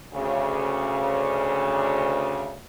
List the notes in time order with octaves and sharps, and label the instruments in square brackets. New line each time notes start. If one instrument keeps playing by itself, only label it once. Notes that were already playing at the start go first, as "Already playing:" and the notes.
[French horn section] D2 C#3